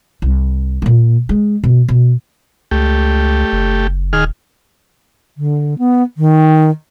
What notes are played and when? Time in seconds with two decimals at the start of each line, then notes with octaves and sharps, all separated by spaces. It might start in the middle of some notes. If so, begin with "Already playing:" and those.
0.22 C2
0.82 A#2 A#3
1.29 G#3
1.64 B2
1.88 B2
2.71 C#2 A3 G4
3.53 F#1
4.13 D#1 D#3 G#4 F6
5.37 D3
5.78 B3
6.17 D#3